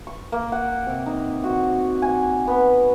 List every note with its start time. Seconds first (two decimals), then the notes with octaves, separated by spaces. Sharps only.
0.07 C#6
0.32 A#3
0.52 F#5
0.86 C3
1.06 D#4
1.44 F#4
2.02 G#5
2.47 B3